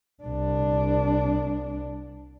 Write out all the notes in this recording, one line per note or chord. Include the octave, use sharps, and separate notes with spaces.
C2 D4